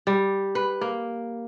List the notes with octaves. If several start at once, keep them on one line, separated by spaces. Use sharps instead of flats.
G3
B4
A#3